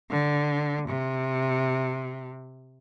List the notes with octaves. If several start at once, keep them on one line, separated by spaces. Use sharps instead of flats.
D3
C3